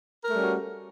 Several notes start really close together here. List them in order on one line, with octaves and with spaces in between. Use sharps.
A#4 A3 G3 C#4 F#4